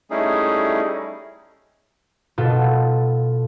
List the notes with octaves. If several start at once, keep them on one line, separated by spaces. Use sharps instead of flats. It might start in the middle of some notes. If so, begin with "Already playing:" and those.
G3 A3 C#4 D#4 E4 G#4
B2 F4 A4